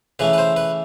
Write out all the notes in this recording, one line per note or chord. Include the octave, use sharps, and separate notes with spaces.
C#3 E3 A3 B4
B4
C5
B4